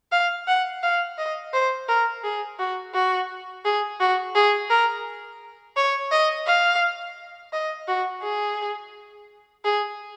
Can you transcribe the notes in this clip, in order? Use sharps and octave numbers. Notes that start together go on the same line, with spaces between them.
F5
F#5
F5
D#5
C5
A#4
G#4
F#4
F#4
G#4
F#4
G#4
A#4
C#5
D#5
F5
D#5
F#4
G#4
G#4